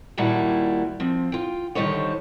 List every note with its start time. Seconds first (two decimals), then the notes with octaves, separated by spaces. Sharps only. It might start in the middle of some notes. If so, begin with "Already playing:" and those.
0.18 D#2 A#2 G3 E4 F#4 A5
1.00 F3 C4
1.32 F4 G5
1.75 D3 D#3 G3 D#4 C5 C#5